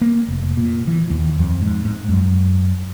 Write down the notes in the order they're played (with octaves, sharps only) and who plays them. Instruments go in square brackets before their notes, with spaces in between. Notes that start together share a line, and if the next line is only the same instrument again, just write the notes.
[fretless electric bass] A#3
F1
A#2
E3
D#2
F2
G#2
G#2
F#2